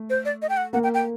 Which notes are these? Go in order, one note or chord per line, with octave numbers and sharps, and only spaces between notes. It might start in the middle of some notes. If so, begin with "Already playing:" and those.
Already playing: A3
C5
D5
D#5
G5
F#5
A#3 F#5
G5
G5